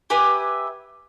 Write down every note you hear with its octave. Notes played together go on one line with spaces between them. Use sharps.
G4 B4 E5 G#5